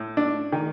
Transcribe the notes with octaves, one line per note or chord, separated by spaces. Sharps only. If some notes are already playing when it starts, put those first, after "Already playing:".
Already playing: A2
D4
D#3